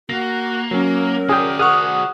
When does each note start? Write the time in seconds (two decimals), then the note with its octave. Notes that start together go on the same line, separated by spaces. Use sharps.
0.10 A#3 F#4 A#6
0.71 F#3 C#4 A#4
1.29 F#4 G#4 D5 G5
1.59 G#4 F#5 C#6 D#6 F6 F#6